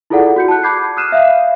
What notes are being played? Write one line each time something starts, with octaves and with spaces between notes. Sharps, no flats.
E4 F4 G#4 A4 D5 F#5
F#4 G6 C#7
A5 F#6
B5 D6 G6 G#6 C7
D#6 F6 F#6 C7 D#7 E7
E5 F5